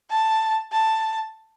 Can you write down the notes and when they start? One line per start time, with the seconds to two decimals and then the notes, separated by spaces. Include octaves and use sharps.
0.10 A5
0.72 A5